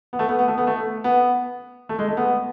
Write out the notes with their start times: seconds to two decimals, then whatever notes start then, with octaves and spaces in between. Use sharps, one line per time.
0.13 B3
0.19 A3
0.29 B3
0.39 B3
0.48 A3
0.58 B3
0.67 A3
1.04 B3
1.89 A3
1.99 G#3
2.08 A3
2.17 B3